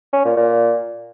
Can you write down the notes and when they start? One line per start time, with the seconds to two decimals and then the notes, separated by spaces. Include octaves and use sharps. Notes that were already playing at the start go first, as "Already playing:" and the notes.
0.13 C#4
0.25 A#2
0.37 A#2